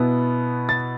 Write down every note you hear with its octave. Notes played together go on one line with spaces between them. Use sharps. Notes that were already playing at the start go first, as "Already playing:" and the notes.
Already playing: B2 B3 E4
A6